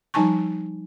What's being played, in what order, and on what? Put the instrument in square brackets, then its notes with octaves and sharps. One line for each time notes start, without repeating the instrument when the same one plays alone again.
[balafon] F3 G3 D#4 G#5 A5 C#6